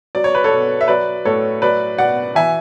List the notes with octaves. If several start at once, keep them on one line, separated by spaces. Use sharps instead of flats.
F#3 D5
C#5
B4
A4 C#5
B2
E5
F#3 B4 D5
A2 A4 C#5
F#3 B4 D5
B2 D5 F#5
E3 E5 G#5